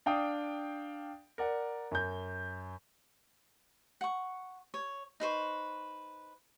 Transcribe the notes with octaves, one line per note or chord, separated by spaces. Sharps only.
D4 F5 G5 D#6
A#4 D5 F#5
F#2 G6
F#5 C#6
C#5
D#4 B4 C5 C#6